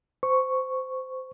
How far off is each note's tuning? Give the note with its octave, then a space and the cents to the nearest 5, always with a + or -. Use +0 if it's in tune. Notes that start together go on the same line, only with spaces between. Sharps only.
C5 -20 C#6 +0